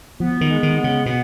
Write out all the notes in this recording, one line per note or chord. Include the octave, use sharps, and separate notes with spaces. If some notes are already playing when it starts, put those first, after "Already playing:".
F3 B3
D#3
G#3
D#3
B3
C#3
B2 B3